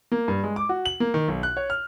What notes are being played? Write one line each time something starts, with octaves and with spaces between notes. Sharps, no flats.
A#3
G2
G#3
D6
F#4
F#7
A#3
D#3
B1
F#6
C#5
F6